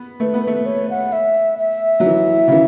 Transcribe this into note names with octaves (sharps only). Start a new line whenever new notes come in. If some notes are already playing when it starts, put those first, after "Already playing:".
Already playing: B3
A3 B4
B3
A3 B4
C#5
F#5
E5
E5
F#3
E3
C#3
E3